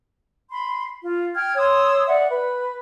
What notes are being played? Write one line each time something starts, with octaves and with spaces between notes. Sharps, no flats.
B5 C6
F4
G5 F6 G#6
C#5 C6 D#6 E6
D5 E5 F#5
B4